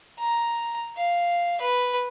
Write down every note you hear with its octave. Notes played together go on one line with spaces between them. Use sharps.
A#5
F5
B4